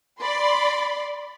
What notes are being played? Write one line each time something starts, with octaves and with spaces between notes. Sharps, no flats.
D5 B5 C6